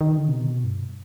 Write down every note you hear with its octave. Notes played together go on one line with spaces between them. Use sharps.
D#3
D3
C3
B2
G2